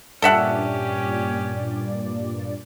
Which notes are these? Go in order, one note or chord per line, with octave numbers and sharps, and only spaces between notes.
G2 A#2 C#4 G4 A4 D5 E5 F#5